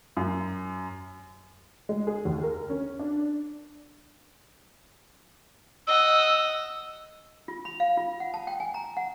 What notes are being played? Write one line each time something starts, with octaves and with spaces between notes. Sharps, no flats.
F#2
G#3
G#4
D#2
A#4
C#4
D4
D#5 F#5 E6
F4
B5
F5
F4
F#5
A5
G5
G#5
A#5
F#5